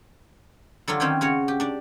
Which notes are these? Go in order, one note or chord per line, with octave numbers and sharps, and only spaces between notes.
D3 F#3 D4 F4
D#3 C4 C#4 G5 G#5
C#3 F#4 C#5
G4
D4 D5